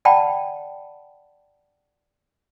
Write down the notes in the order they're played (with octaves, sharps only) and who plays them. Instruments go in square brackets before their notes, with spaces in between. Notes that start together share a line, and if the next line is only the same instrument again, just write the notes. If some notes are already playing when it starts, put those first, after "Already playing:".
[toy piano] D5 F#5 G5 A5 B5